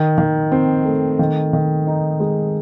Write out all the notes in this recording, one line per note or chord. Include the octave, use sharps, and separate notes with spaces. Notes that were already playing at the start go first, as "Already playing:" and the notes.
Already playing: D#3
D#3
C4
A3
D#3
D#3
D#4
G#3